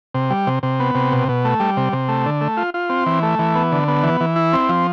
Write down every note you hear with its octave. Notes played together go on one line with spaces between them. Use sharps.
C3
G3
C3
C3
B3
C3
B2
B2
A3
G3
C3
C3
A3
D3
A3
F4
F4
C4
E3
A3
E3
B3
D3
B3
E3
E3
E4
C4
F3